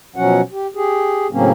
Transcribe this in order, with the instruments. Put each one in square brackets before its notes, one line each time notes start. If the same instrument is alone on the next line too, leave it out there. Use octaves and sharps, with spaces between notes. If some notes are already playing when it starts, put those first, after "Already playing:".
[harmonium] B2 F3 F#3 C#4 F#4 F#5
G4
G4 G#4
A2 C#3 F#3 A#3 C4 C#4